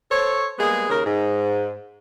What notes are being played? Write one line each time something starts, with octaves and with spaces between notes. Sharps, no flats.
A4 C5 C#5
G3 G#3 A#3 B3 G#4
D#2 C#3 A#4
G#2